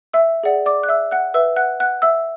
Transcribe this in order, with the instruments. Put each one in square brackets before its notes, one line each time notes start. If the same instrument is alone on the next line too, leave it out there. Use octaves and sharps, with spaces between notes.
[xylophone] E5 E6
G#4 D5 F#5
D5 D6
F#6
E5 E6
F#5 F#6
B4 E5 E6
F#5 F#6
F#5 F#6
E5 E6